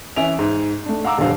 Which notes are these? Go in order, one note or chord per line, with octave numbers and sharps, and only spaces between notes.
E3 C#4 E5 G#5 D7 F7
G#2
A3 D4
F5 F#5 A#5 D6 E6
D#1 E2 G2 D3 F3 F5